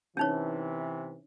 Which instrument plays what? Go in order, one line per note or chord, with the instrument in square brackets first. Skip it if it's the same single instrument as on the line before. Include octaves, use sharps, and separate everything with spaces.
[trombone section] C3 E3 [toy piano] C#4 D#4 C#5